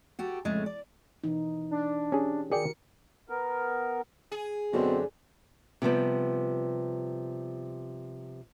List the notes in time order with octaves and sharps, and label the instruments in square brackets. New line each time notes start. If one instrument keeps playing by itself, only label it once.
[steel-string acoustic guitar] F#4 G4 A4
F2 A2 C#3 G#3 A3
D5
[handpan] B2 E3 D#4
[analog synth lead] D4
[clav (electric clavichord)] C#4 G#4 [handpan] G4
[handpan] D#3 F#4 A#4 [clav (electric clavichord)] G#4 D5 G5 [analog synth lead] C#7
[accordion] B3 A#4
[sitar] G#4
[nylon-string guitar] F#2 D3 [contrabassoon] B2 [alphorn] C4
[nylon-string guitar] C3 F3 G3 B3